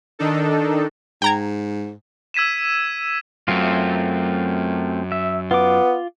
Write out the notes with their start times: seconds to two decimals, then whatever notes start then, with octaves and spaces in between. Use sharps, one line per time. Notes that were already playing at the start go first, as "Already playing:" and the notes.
0.19 D#3 D4 D#4 A4
1.22 G#2 G5 A#5 G#6
2.34 E6 G#6 B6 D#7 E7
3.48 F#2 A3 C4 F4
5.12 E5
5.51 B3 F4 D6